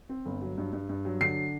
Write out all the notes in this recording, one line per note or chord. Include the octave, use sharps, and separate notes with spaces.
C4
G1
F#3
G2
G2
G2
F#3
D3 C7